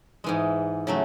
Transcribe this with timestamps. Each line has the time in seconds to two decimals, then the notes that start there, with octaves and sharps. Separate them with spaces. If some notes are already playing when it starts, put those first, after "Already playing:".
0.24 G#2 E3 G#3
0.87 C#3 F#3 A3